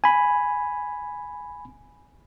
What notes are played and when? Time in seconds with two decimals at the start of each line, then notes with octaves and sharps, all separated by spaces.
0.04 G#5 B5